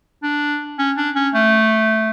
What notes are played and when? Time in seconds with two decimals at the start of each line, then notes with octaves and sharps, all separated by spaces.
0.23 D4
0.78 C#4
0.97 D4
1.15 C#4
1.34 A3